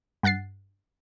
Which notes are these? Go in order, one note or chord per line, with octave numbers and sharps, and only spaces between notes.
G2 F#5 F#6 A6 C7